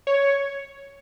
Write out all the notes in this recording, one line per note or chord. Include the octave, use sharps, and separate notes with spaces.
C#5